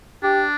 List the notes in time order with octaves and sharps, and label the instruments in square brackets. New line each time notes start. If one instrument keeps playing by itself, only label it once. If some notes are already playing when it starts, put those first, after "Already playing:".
[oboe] D4 [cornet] G4